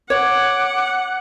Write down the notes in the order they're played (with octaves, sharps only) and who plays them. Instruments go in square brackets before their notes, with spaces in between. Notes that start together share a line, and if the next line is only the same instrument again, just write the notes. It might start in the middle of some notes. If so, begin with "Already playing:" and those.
[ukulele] C#5 [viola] F#5 [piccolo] D6